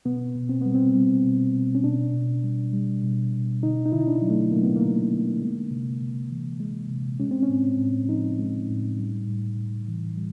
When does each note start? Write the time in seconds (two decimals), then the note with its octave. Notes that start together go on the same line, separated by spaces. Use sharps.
0.05 B2 B3
0.35 B2
0.49 C4
0.61 G3 B3
0.75 C4
0.95 G3
1.24 B2
1.54 B2
1.75 C#4
1.84 B2 D4
2.14 B2
2.44 G3
2.73 G3
3.03 B2
3.33 B2
3.63 D3 D#4
3.85 D#4
3.92 D3 E4
4.00 D#4
4.07 D4
4.22 F#3
4.30 A3
4.52 F#3 A#3
4.63 B3
4.76 A#3
4.81 D3
5.11 D3
5.42 G#3
5.71 C3
6.01 C3
6.31 E3
6.60 G#3
6.89 C3
7.20 G#3 C#4
7.31 C4
7.42 C#4
7.49 A2
7.79 A2
8.09 F3 D#4
8.39 G#3
8.69 A2
8.99 G3
9.28 A2
9.58 A2
9.88 E3
10.17 G3